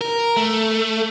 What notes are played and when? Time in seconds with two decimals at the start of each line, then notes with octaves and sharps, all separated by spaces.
0.01 A#4
0.37 A3